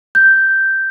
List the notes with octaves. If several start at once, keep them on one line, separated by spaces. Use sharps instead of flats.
G6